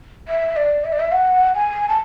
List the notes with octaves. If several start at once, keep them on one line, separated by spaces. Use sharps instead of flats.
E5
D5
E5
D5
E5
F#5
G#5
A5